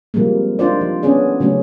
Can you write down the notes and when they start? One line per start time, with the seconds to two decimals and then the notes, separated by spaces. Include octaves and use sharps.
0.14 C3 F3 G3 G#3 A#3
0.59 D4 D#4 F4 C5 D5
0.81 F3
1.03 B3 C#4 D4 G#4 D5
1.40 C#3 F#3 A3 C#4